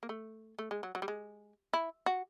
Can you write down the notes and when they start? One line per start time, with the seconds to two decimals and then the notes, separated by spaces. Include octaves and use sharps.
0.03 A#3
0.09 A3
0.59 A3
0.71 G#3
0.83 F#3
0.95 F#3
1.02 G3
1.08 G#3
1.73 E4
2.06 F#4